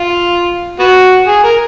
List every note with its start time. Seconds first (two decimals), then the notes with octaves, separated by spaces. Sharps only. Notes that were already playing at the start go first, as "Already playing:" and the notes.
Already playing: F4
0.79 B3 F#4
1.27 G#4
1.44 A#4